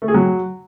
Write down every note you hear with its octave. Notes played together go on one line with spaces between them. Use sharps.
A3
G#4
F#3